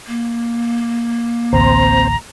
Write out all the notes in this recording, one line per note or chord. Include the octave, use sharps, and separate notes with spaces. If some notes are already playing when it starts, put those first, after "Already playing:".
A#3
A1 D2 C4 C5 A#5